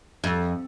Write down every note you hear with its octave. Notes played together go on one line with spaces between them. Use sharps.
F2